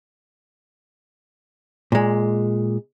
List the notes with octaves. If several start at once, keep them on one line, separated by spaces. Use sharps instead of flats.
A#2 G#3